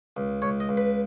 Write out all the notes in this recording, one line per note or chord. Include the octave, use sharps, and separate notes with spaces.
C#2
C#2 C#5
D#5
C#2
B4